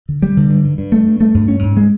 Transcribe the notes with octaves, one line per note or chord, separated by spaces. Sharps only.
D3
G3
D3
G2
G2
G2
A3
G2
A3
G2
C#4
G#2
G#3